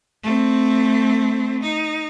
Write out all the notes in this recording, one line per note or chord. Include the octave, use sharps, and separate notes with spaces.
A3 C4
D#4